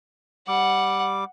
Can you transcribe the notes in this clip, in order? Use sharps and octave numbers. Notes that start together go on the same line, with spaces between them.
G3 F#5 D6